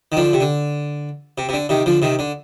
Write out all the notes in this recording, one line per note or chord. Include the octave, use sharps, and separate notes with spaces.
D#3
D3 F3
C3
D3
C3
C3
D3
C3 D#3
D3 F3
C3 D#3
D3